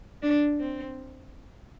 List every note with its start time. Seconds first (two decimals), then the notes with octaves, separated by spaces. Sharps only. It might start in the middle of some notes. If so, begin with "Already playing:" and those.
0.23 D4
0.60 C4